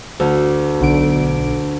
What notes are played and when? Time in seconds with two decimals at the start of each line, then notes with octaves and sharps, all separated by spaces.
0.20 D2
0.81 B1 D3 D7